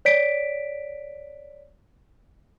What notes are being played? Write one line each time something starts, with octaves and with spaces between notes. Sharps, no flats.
C#5 D5 B6 D7